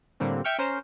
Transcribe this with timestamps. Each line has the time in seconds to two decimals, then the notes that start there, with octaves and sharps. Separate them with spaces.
0.20 A2 D3 G3 A#3 C4
0.44 E5 G5 C#6 F6
0.58 C#4 A#4 C5 E7